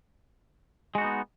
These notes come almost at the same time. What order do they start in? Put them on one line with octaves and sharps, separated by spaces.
G#3 F#4 D#4 B3